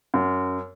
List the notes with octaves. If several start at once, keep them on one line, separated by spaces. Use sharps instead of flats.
F#2